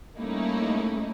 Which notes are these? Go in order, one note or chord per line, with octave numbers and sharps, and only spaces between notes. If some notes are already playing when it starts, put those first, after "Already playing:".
G3 A3 A#3 C#4 D#4 E4